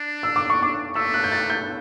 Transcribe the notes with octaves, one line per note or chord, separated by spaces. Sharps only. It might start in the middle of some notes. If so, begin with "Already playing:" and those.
Already playing: D4
E6
D6
C#6
D6
A3 E6
F#6
G6
A6
G6